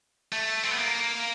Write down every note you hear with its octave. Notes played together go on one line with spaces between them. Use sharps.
A3
C4
B3
A#3